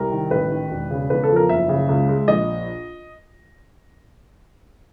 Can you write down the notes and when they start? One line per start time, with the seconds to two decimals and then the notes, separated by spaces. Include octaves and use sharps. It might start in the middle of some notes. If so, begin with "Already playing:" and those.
Already playing: C2 A#4
0.11 D#3
0.31 A1 B4
0.51 D#3
0.71 E1
0.91 C#3
1.10 E2 B4
1.24 A4
1.29 F3
1.36 A#4
1.49 F#1 E5
1.69 C#3
1.89 C#2
2.09 G#3
2.28 A#1 D#5